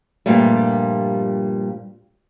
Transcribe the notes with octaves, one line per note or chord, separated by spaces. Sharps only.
G2 A#2 F3 G3 A3